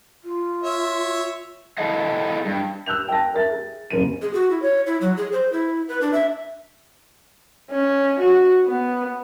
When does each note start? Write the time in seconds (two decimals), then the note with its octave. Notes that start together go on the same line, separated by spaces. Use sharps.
0.25 F4
0.63 C#5 E5
1.78 E4 G#4 A4 D#5 F5
2.45 G2
2.86 E6 F#6 G6 F7
3.08 G5 A5 A#6
3.33 A#4 E5 A6
3.50 G#4
3.90 F#1 C#4 D#7
4.22 G#4
4.34 F#4
4.50 E4
4.62 C#5
4.86 E4
5.01 F#3
5.17 G#4
5.32 C5
5.52 E4
5.88 B4
6.01 D4
6.13 E5
7.71 C#4
8.19 F#4
8.66 B3